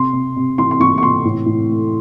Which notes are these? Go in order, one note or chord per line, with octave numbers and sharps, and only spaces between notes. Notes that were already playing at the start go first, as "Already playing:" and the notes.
Already playing: C3 C6
C3
C3
E3 C6
C6
E3 C#6
C#6
C3 C6
A2
A2
A3